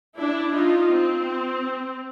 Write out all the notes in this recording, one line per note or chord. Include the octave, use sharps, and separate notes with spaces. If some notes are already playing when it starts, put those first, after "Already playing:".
D4 E4
D#4 F4
C4